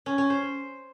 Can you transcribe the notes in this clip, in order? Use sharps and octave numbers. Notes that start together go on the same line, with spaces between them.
C#4
C#4
C5